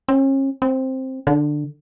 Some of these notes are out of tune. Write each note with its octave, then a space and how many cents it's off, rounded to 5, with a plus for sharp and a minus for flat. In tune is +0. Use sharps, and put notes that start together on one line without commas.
C#4 -40
C4 +5
D3 +15